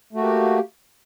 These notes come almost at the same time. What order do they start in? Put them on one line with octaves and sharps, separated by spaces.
A3 F#4 A#3 G4